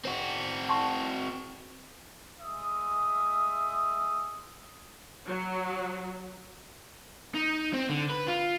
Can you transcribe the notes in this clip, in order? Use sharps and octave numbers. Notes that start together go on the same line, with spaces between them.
C4 F#4
A5 C6 C#6
G#3 E5 D#6
F#3
D#4
C4
D3
B4
F4